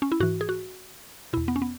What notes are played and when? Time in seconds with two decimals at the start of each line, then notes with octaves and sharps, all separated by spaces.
0.02 C#4
0.12 E4
0.20 G#2 E3 F#4
0.41 G#4
0.49 F#4
1.33 E2 B2 E4
1.48 B3
1.56 C#4
1.62 B3